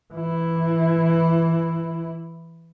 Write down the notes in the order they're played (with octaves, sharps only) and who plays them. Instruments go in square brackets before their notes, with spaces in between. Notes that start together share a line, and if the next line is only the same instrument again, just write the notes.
[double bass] E3 E4